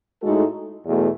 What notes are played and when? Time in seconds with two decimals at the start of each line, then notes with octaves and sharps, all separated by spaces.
0.21 A2 G#3 D#4 F#4 A4
0.85 E2 B2 A3